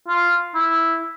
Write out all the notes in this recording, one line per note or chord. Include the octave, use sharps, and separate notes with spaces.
F4
E4